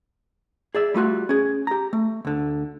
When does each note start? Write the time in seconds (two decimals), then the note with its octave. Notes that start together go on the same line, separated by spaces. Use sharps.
0.75 G#4 D5 E5
0.94 G3 A3 F4 F#4
1.29 C#4 G#4
1.67 G4 A#5
1.93 A3
2.25 D2 D3